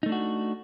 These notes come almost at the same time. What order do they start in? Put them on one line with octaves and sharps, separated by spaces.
D#4 A3 D4 F#4